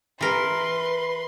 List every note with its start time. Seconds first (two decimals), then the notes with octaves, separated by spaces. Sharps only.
0.21 E3 A#4 B4 C6